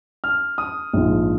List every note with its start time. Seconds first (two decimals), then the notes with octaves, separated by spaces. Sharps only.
0.24 F6
0.58 D#6
0.93 A#1 G#2 F3